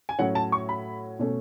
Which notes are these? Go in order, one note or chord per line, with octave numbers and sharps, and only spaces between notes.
G#5
A2 F#3 C#4 F#5
A5
C#6
B5
B2 A3 C#4